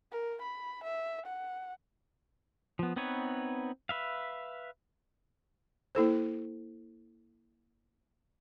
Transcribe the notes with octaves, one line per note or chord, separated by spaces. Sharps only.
A#4
B5
E5
F#5
F3 B3
B3 C4 D#4 B4 C#5
B4 E5 F5
A#3 E4 A4 C5